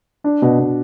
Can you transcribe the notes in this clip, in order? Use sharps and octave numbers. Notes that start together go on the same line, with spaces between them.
D4
B2
B2